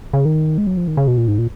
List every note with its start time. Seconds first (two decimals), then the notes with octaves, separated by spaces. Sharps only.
0.13 C#3
0.25 D#3
0.58 G#3
0.67 F#3
0.77 F3
0.87 D#3
0.97 C#3
1.07 B2
1.17 A#2
1.28 G#2
1.38 A#2